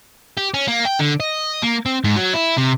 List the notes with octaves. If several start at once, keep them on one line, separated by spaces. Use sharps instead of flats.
G4
C#4
A#3
G5
D3
D#5
A#3
C4
G#2
F#3
E4
C3